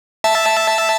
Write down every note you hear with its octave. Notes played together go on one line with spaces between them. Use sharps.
E5 A5